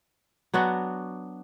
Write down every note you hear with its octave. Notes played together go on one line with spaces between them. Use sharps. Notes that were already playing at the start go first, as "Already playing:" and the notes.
F#3 B3 D4 F#4